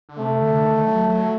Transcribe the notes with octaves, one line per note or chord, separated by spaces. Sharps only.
D3
C3 A3
D3
D#3
F#3
F#3